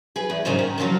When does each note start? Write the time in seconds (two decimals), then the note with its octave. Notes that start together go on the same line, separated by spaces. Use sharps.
0.16 G#4 B4
0.30 E2
0.45 G#2 C#3 A#3 D#4 C5
0.59 D#3
0.78 G#2 C#3 F3 F#3 F4